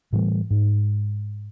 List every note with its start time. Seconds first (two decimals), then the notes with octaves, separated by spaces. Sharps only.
0.13 A2 E3 G3 A3
0.51 G#2